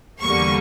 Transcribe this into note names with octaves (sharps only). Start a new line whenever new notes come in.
E2 D3 G3 A#3 C#6